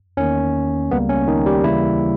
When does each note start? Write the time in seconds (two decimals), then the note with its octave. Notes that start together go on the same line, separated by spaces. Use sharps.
0.17 E2 D#3 A#3 C#4
0.91 C#2 C#3 G3 A#3 B3
1.09 C#4
1.28 D#3 D#4
1.46 G3 G4
1.64 D#2 C#3 E3 G3 A#3 E4